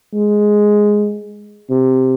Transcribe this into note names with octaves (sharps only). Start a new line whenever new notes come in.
G#3
C3